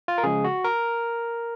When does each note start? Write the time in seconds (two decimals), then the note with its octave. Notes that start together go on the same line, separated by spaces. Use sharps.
0.08 F4
0.18 A#4
0.24 C#3 F3 G#3 G#4
0.44 F#4
0.64 A#4